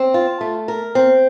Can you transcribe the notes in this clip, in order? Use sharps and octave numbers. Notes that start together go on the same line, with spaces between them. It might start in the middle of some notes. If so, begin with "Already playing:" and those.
Already playing: C4
F4
A3
A#4
C4